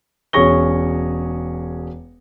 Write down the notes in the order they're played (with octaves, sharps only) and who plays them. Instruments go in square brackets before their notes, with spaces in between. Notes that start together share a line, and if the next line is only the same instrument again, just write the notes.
[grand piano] E1 C#4 G#4 C#6 A#6 G7